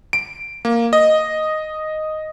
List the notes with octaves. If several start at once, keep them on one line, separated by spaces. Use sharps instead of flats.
D7
A#3
D#5